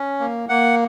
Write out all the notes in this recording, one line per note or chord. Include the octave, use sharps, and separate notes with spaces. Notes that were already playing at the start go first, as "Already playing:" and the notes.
Already playing: C#4
A#3
A#3 F#5